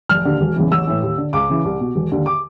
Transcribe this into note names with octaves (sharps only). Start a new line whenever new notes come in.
F1 F6
D#2 D3
E1
E2 C#3 E3
A1 E6
A2 E3
D#2
D3
C#2 D6
C#3 E3
C2
B2
E1
D#2 D3
D6